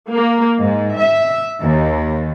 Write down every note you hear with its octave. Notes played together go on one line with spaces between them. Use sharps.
A#3
G#2
E5
D#2